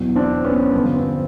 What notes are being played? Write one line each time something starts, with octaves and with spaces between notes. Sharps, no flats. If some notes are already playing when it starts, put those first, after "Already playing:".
Already playing: E2 B2 F#3
C4 D4
B3 C#4
G2 D3 F3 B3
C4